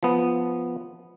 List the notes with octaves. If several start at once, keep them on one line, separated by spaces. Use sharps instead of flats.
F3 B3